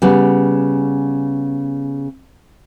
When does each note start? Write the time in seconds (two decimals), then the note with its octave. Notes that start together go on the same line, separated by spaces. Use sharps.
0.02 C#3 G3 B3